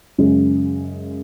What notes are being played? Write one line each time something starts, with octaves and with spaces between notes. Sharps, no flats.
F#2 C#3 G#3